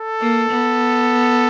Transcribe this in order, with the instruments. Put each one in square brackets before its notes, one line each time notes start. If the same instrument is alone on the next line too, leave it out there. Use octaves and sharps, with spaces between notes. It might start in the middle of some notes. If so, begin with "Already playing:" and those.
Already playing: [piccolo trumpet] A4
[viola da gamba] A#3
B3